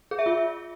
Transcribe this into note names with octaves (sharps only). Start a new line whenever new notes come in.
G#4
E5
F4